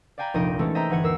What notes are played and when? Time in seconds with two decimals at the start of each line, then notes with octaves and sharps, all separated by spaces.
0.18 D5 F5 G5 G#5 A#5 B5
0.34 F1 A#1 D#4 D#5 D7
0.59 E3 G#3 A3 C#4 A4
0.75 C5 D#5 E5 G5 A#5
0.90 G1 E3 F#5 G#5 C#7
1.03 D#2 A#4 E6 C7